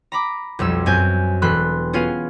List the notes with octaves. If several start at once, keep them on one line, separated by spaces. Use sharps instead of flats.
A#5 B5 D6
B1 F2 G3 E6
F#2 C4 G#5 G6
E1 A4 B5 C6 F#6
B3 C#4 F4 G#4 F5